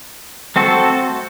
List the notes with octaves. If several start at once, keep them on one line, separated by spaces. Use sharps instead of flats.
A3 C4 F#4 A4